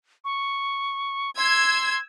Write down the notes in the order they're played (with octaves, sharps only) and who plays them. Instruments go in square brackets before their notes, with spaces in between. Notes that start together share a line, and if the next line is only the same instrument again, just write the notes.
[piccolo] C#6
[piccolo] C6 [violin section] E6 G#6